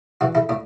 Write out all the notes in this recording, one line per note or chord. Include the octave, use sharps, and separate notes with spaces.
E3 D4 F#4
E4 A4
A2 D4